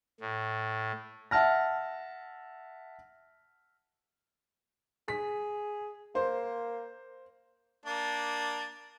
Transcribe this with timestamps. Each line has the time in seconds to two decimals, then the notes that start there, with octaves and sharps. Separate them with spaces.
0.20 A2
1.31 E5 F#5 A5 F6 A#6
5.08 G#4 B6
6.15 A#3 C5
7.85 A#3 D4